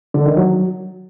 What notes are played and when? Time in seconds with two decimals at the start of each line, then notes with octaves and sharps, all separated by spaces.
0.14 D3
0.26 D#3
0.37 F#3